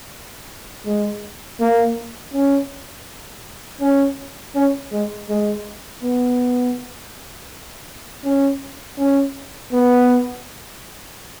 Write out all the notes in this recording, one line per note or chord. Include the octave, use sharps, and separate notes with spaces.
G#3
A#3
C#4
C#4
C#4
G#3
G#3
B3
C#4
C#4
B3